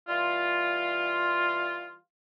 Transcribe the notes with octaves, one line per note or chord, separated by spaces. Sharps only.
E3 G3 F4